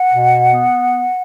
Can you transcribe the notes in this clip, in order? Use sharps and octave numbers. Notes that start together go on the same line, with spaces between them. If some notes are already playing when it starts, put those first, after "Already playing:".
Already playing: F#5
B2
B3